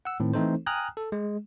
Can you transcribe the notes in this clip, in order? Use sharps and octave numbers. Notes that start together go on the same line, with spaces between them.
F#5 E6
A2 D#3 C4
E3 A3 C4 D#4 A4 C5
G5 G#5 A#5 D#6 F6 F#6
A4
G#3